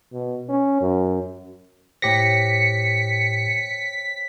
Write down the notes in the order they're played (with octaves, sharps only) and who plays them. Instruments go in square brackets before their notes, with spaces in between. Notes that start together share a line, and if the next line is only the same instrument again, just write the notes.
[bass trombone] B2
C#4
F#2
[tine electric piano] A2 G4 A#6 [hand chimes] C5 C#5 G5 [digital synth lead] B6 [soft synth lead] C#7